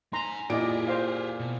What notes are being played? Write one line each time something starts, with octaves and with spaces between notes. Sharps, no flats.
D#4 G#5 A#5 C6
A#2 E4 G4 G#4 D5 D#5 D7
C5 F5
B2